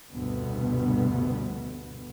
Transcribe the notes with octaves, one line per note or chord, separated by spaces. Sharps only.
F1 D2 G2 B2 B3